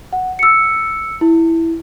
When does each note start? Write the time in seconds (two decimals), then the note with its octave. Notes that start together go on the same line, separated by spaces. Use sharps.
0.13 F#5
0.39 E6 C#7
1.21 E4